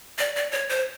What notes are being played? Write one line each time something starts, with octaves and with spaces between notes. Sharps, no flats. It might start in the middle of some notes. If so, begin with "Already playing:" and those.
D5
D5
C#5
C5